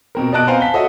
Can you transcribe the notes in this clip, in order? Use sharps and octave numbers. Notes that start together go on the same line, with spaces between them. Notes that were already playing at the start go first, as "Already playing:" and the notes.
B2 C4 A#4
B2 D5 D#5 A5 F#6 D7
B3 C4 C5 F5 G#5 A#5
A5 B6 G7
F#4 A4 C#5 D#5 E5